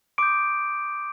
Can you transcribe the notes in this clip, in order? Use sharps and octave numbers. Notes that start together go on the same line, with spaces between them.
C6 D6 D#6 G6 D7